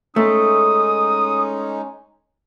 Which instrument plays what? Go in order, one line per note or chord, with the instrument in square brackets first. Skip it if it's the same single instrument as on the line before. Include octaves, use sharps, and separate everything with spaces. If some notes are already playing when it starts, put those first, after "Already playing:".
[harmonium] G#3 C#4 D#4 [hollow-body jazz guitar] A3 [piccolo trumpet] D#6